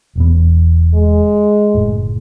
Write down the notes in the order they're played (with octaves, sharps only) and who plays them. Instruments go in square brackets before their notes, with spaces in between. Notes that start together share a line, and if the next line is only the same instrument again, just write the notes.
[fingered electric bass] E1 E2 B3
[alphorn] G#3
[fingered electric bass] F#1 A2